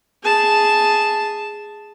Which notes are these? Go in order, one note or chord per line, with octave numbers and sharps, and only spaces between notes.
G#4 A5